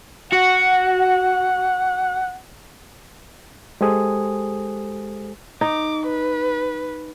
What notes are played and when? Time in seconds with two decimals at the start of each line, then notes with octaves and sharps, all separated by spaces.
0.32 F#4 F#5
3.81 G#3 G4 A4 C5 G#5 D#6
5.61 D#4 D6
6.06 B4